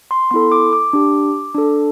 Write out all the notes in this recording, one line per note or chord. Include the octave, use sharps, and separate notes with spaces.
C6
B3 E4 A4 C6
D6
D6
D4 G4
D4 A4